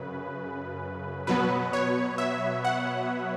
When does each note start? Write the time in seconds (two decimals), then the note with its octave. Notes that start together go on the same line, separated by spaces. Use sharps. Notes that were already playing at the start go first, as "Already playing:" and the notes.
Already playing: F#2 C#3 B4
1.27 B2 F#3 B3 B4
1.73 C#5
2.18 E5
2.64 F#5